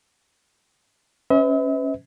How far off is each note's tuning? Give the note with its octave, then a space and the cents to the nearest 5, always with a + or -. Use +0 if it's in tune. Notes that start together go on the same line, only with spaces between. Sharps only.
C#4 -5 B4 +35 E5 -45